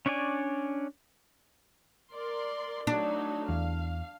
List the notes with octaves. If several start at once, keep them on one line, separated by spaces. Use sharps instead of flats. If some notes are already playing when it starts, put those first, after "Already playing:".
C#4 D4 C#5 D5 G#5
A#4 D5 C6
F#3 A3 D4 D#4
E2 F5